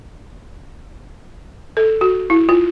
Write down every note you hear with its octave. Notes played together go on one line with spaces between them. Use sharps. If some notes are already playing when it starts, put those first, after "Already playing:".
A4
F#4
E4
F4